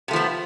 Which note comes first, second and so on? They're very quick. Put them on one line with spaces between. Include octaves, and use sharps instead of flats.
C3 A3 F3 B3